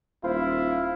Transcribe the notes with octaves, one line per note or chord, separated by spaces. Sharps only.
D#1 E4 F4 C5